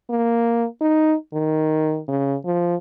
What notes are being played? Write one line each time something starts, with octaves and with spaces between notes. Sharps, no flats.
A#3
D#4
D#3
C#3
F3